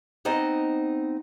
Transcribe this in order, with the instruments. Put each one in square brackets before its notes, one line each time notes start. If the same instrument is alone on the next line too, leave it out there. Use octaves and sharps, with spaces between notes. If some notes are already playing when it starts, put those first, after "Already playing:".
[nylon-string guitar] B3 C4 D#4 C5 D#5